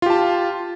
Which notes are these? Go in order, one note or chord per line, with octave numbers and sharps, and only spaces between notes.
F4 G4 A5